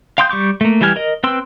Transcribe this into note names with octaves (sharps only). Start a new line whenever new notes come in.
F5 G5 C6 D#6 G6
G3 C#6 D6 G6
A3 A#3
E3 G3 G4 G#5 F6
A#4 D#5
C4 B4 G5 C6 E6